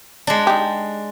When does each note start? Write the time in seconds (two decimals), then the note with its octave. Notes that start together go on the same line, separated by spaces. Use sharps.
0.27 G#3 D4
0.47 D#4 G4